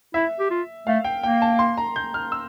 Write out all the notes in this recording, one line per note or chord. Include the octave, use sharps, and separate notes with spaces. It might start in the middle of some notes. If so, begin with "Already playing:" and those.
E4 E5
G4
F4
A3 F5
G5
A#3 G5
A5
C6
A#5
G6
F6
E6